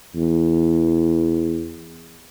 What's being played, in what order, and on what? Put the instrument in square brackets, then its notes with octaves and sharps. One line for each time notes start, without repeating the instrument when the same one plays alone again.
[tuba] E2